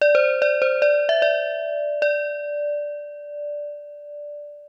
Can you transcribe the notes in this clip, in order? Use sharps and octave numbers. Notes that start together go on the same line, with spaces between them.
D5
C5
D5
C5
D5
E5
D5
D5